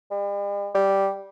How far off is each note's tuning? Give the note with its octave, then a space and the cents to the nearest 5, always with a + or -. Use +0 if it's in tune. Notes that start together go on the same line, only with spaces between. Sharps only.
G3 +45
G3 -5